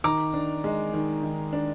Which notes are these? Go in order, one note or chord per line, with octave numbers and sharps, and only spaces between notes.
D#3 A#5 D6
D4
G#3
D#3
D#3
D4